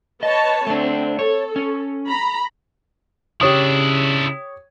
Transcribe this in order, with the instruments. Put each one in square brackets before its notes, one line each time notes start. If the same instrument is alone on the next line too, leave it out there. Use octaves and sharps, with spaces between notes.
[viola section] B4 C#5 A5 [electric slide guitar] D#5
[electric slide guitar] A3 D4 [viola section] C4
[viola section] A4 [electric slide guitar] C#5
[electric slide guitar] C#4
[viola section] A#5 B5
[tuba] C#3 [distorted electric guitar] D4 E4 [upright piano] G4 C#5 D#6